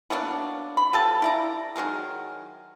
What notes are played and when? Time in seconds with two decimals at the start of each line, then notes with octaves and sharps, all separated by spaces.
0.10 B2 F#3 A#3 D4
0.77 B5
0.93 F3 G4 A4 A5
1.22 E4 D5 A#5
1.76 D#3 F#3 G#3 A#4